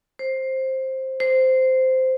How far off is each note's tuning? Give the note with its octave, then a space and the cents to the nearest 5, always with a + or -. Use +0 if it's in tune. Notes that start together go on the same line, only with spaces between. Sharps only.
C5 +10
C5 -10